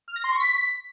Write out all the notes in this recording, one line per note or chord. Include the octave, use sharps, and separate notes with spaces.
F6
A#6
C6
C#6
B6